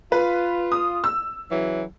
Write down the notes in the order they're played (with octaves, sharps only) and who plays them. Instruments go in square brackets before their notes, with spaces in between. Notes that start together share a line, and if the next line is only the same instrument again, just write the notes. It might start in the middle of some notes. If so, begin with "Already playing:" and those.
[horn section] F4 [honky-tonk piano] B4
[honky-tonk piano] D#6
E6
[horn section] C#3 E3 F#3